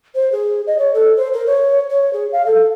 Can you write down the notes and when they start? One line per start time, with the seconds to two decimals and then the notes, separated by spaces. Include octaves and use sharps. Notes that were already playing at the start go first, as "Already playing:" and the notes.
0.15 C5
0.32 G#4
0.67 D#5
0.79 C#5
0.94 A4
1.17 C5
1.33 A#4
1.47 C#5
1.90 C#5
2.13 G#4
2.32 F5
2.46 A4